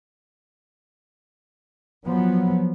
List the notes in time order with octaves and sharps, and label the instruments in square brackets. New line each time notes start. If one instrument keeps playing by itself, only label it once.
[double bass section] F3 F#3 B3